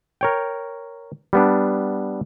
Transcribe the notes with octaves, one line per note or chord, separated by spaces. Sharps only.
A#4 C#5 G5
G3 B3 D4